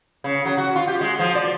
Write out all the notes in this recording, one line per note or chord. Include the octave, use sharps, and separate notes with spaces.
C#3
F#3
F#4
F4
G4
G#3
F3
D5